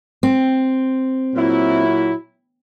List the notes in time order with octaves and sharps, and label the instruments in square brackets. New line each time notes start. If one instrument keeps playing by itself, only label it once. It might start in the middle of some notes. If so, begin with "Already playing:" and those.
[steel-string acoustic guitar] C4
[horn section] A#2 F#3 E4